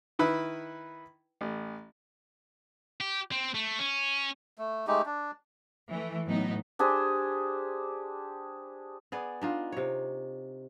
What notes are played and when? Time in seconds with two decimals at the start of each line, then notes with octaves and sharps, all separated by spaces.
0.19 D#3 E4 B4
1.41 A1
3.00 G4
3.32 C4
3.55 A3
3.79 C#4
4.58 A3
4.87 G#3 A3 D#4 G4
5.06 D4
5.90 E3 A3
6.25 A2 F#3 B3 D#4
6.79 D4 G4 G#4 C5
9.12 B3 G#4 D5
9.42 D4 D#4 F4
9.72 C3 C#5